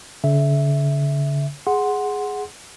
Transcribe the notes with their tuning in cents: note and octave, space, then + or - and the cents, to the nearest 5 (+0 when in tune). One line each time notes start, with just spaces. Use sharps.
D3 -45 E5 +0
G#4 +0 F#5 +0 C6 +0